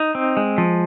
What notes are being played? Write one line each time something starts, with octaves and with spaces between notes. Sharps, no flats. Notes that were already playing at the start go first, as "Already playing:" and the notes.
Already playing: D#4
C4
G#3
F3